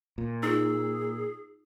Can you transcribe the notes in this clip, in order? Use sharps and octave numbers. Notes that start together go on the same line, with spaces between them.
A#2
D#4 F4 G#4 E6